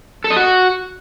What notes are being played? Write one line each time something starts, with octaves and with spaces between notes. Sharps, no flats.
A4
D#5
F#4